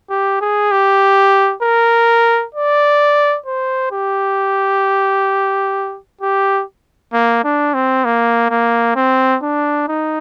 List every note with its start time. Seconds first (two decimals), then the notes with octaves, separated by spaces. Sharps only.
0.10 G4
0.41 G#4
0.71 G4
1.63 A#4
2.55 D5
3.46 C5
3.92 G4
6.21 G4
7.13 A#3
7.44 D4
7.74 C4
8.05 A#3
8.50 A#3
8.96 C4
9.42 D4
9.88 D#4